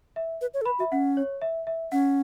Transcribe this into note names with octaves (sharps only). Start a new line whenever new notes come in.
E5
B4
C#5
A4
B4 B5
F#4 E5
C#4 F#5
C#5
E5
E5
C#4 F#5